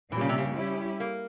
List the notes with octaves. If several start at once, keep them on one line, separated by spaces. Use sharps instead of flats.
A#2 E3 G3 C#4 G4
C#3
C3
C#3
G3 C#4 E4 G4
A#3